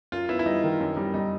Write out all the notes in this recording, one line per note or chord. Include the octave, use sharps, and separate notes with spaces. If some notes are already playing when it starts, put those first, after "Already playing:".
F#2 F4
B3 E4
E4
G3 D#4
D#3
F#2
G3
G3 D#4